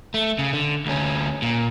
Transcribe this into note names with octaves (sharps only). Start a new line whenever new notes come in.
A3
C#3
D3
D2 C#4
A#2